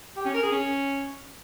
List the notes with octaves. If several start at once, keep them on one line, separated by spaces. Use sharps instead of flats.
G4
C#4
A#4
G#4
C#4